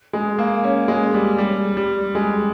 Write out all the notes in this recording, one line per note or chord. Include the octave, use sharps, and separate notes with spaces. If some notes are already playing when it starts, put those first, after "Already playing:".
G#3
A#3
C#4
G#3
G3
G3
G3
G#3